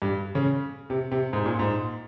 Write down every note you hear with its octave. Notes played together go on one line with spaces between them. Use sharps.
G2
C#3
C3
C3
G#2
A#2
G#2